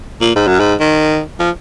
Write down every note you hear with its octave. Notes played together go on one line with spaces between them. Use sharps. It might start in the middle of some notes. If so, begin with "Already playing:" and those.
A#2
G#2
F#2
G#2
D#3
F3